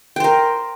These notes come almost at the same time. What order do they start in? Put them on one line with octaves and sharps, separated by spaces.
G5 C5 A#4